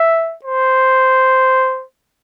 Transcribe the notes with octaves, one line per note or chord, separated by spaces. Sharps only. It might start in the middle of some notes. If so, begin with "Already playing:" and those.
Already playing: E5
C5